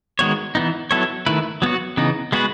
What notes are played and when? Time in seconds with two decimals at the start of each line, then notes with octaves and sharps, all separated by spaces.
0.19 D#3 G#3 B3 F#4 C#5
0.55 E3 B3 D#4
0.91 F#3 B3 E4 A4 C#5
1.26 D#3 A3 E4 B4
1.62 F#3 B3 F#4
1.97 C#3 E3 B3 D#4
2.32 G#3 B3 F#4 B4